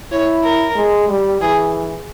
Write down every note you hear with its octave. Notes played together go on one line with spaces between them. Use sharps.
E4 C#5
A#4
G#3
G3
E3 G#4